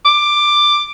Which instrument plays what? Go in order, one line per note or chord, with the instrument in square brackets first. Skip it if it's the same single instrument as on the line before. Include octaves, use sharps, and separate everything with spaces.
[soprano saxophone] D6